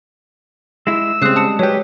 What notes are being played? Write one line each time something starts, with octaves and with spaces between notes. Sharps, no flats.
G#3 E4 E6
C#3 G3 G#3 C4 D#6 F#6 C7
A5 D#6 C#7
F#3 G4 B4 C#5